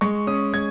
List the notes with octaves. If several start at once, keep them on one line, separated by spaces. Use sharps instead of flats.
G#3 C#6
C#4 D#6
G#3 G#6